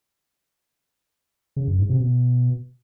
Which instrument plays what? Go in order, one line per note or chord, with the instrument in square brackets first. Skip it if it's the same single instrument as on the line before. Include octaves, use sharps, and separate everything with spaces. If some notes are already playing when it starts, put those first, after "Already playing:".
[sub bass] C#3
F#2
G#2
C3
B2